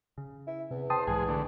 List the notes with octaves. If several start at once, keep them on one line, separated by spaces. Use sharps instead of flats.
C#3
E4
E2 C3
C5 G5 A5 D#6
B1 G#2 E3 G#4
D3 A3